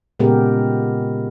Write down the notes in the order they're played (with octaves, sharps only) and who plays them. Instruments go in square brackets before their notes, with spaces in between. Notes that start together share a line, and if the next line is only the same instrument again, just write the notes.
[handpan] A#2 C#3 G#3 B3 G4 A#4